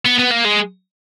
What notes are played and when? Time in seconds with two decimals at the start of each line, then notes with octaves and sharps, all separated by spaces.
0.06 B3
0.19 B3
0.31 A#3
0.45 G#3